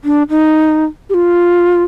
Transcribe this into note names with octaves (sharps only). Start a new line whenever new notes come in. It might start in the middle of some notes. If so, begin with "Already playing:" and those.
D4
D#4
G4
F4